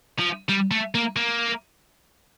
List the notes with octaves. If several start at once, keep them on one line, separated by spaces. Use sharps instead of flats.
F3
G3
A3
A#3
A#3